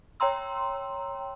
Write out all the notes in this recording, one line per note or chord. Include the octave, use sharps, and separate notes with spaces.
C#5 G5 A#5 C6 E6